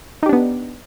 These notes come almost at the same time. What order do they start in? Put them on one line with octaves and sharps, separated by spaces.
D#4 G4 D4 B3